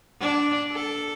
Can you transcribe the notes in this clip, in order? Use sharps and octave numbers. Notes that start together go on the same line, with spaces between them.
D4
A4